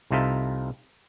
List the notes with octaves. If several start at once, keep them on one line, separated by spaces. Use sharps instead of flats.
C2 C3 D#4 F4 A4 E5